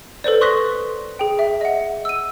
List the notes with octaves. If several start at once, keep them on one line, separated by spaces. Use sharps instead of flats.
A4 B4 C5 D5
C6 C#6 D#6 F#6 A#6 B6
G#4 G5
E5
D#5 F#5
E6 D#7